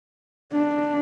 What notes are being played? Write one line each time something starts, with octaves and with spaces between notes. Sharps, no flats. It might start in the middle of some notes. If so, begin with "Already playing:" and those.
D4